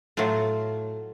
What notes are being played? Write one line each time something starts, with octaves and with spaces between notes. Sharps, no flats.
A2 F#3 A3 F4